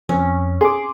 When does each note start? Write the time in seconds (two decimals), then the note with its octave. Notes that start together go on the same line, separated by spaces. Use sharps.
0.09 F2 C#4
0.61 G#4 C6 D6